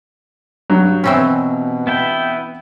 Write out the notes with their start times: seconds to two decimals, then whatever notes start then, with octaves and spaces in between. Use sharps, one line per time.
0.70 G2 F#3
1.04 B2 E3 C4 C#4
1.87 B3 E4 G5